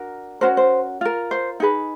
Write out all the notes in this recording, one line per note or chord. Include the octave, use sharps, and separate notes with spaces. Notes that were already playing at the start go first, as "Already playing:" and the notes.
Already playing: D4 F#4 A#4
C#4 F#4 A#4 C5
C5
F4 A#4
C5
D#4 G#4 B4